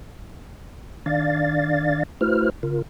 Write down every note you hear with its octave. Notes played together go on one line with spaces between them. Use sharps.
D#3 D4 D5 F5 A6
A3 E4 F#4 B4 C5 F6
C#3 F4 A#4